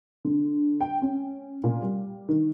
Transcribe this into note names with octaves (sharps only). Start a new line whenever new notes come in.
D3
G5
C#4
A#2
G3
D#3